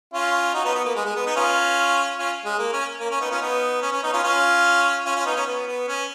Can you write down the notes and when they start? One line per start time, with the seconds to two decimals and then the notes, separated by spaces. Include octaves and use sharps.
0.13 C#4 F4
0.54 D#4 F#4
0.65 B3 D#4
0.75 B3
0.85 A#3
0.95 G#3
1.06 G#3
1.16 B3
1.26 B3 D#4
1.36 C#4 F4
2.18 C#4 F4
2.45 G#3
2.59 A#3
2.73 C#4
3.00 A#3
3.11 C#4
3.21 B3 D#4
3.30 C#4 F4
3.41 B3 D#4
3.82 C#4
3.92 C#4
4.03 B3 D#4
4.13 C#4 F4
4.23 C#4 F4
5.05 C#4 F4
5.15 C#4 F4
5.25 B3 D#4
5.36 C#4
5.47 B3
5.67 B3
5.88 C#4